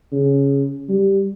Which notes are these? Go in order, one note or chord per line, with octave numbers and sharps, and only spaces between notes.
C#3
G3